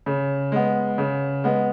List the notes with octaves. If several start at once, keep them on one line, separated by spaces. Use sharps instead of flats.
C#3
G#3 B3
C#3
G#3 B3